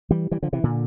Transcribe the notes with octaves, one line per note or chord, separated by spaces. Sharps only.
E3 G3
E3 G3
D3 F3
C3 E3
A#2 D3